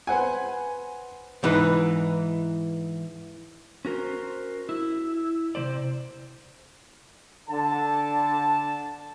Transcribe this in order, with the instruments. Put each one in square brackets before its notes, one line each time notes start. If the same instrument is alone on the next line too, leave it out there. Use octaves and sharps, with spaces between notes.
[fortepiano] B4 C5 F#5 G#5
[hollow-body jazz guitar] G#2 E3 D#4 B4
[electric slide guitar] C#4 F#4 A#4 C5
E4
C3 G#3 C5 D5
[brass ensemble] D3 A5